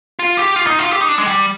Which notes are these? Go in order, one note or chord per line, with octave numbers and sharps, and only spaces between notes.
F4
G4
F4
D#4
F4
G4
D#4
D4
G#3
G3